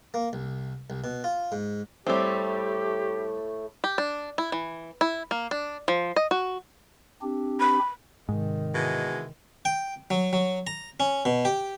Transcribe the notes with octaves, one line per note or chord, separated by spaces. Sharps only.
A#3
C2
C2
B2
F4
G#2
A2 G3 A3 C4 G4
G4
D4
E4
E3
E4
A#3
D4
F3
D#5
F#4
C4 D4 G4
B5
G#2 C3 D#3
B2 E3 G#3
G5
F#3
F#3
A#5
C#4
B2
G4